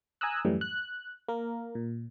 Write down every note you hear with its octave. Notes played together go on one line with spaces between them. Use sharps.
G#5 A#5 D#6 E6 F#6
F#2 A2 E3 G3
F#6
A#3 A#4
A#2